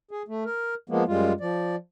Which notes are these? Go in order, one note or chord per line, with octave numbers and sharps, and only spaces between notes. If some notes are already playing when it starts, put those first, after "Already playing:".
G#4
A3
A#4
F3 G#3 A#3 B3
F#2 G3 G#3 F4
F3 D5